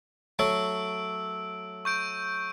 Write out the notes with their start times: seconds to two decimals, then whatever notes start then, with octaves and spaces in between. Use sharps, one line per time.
0.39 F#3 A3 C#5 E6 D7
1.85 C#6 G6 D7